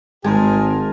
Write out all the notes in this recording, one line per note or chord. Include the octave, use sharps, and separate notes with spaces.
G#1 G#3 G#4 A#4 C5 A5